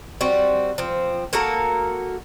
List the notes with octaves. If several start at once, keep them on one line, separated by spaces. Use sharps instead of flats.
G3 C4 F#4
F3 C4
A#3 F#4 A4 A#4